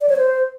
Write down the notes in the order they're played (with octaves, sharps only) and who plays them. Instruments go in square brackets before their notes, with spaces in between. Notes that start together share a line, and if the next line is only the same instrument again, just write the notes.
[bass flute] D5
C#5
C5